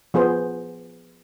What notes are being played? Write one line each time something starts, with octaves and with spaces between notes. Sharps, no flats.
F3 B3 G#4 C5